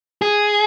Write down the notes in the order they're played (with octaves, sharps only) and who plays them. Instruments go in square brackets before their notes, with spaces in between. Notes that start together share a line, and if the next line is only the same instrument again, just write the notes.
[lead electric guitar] G#4